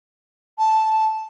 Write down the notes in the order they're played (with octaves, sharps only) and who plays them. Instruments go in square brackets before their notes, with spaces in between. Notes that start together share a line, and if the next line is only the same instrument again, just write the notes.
[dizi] A5